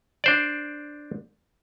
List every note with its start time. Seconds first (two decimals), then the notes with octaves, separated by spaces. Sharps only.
0.24 D4 C5 D5